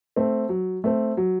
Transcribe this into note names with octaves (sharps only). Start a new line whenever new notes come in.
A3 C4
F#3
A3 C4
F#3